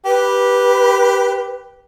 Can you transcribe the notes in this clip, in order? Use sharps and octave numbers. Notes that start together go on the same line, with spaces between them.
G4 B4